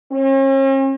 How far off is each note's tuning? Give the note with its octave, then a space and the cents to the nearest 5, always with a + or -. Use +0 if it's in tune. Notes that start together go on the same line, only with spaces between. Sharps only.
C#4 -45